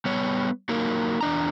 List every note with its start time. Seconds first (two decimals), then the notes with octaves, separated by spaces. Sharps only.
0.05 G3 B3 C#5
0.69 F#3 A#3 D#4 A#4
1.21 E2 D4 A#5